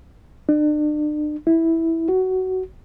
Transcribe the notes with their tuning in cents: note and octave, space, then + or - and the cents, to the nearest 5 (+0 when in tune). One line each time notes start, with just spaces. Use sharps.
D4 +40
E4 -10
F#4 +15